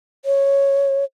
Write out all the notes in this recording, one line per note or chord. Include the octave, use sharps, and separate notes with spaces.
C#5